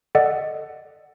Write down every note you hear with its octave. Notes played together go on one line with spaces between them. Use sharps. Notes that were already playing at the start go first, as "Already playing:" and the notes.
A4 D5 D#5 F#5